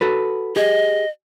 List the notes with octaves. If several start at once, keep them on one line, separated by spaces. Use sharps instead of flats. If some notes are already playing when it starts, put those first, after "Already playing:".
F#4 A4 B4
G4 G#4 D#5